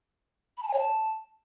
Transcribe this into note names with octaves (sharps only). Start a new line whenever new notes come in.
B5
A5
G#5
C#5
A5